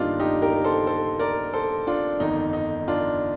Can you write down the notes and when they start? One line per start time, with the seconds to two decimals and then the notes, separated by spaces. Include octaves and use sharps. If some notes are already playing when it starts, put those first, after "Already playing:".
Already playing: G1 G2 D#3 G3 A#3 D4 D#4 F4
0.20 D#4 G4
0.42 G4 A#4
0.64 A4 C5
0.87 A4 C5
1.19 A#4 D5
1.53 A4 C5
1.87 D4 F4
2.20 G1 F2 D#3 D#4
2.53 D#4
2.88 D4 F4